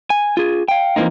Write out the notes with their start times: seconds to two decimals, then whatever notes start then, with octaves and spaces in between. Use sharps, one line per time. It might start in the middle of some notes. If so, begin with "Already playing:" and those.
0.10 G#5
0.37 F4 G#4
0.68 F5 G5
0.96 E3 F3 G3 A#3 C4 D#4